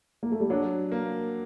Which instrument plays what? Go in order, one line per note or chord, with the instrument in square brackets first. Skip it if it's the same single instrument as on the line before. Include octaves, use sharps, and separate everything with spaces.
[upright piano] A#3
A3
G3
[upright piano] F#3 [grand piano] D4
[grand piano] A#3